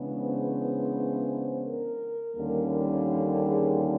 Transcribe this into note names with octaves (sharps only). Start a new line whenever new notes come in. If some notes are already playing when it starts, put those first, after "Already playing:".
Already playing: C#3 E3 G#3 B3 D4
C5
A#4
D#2 D3 G3 A#3 C#4
A4
G#4